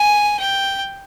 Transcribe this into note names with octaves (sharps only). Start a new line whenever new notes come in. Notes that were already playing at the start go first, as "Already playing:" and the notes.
Already playing: G#5
G5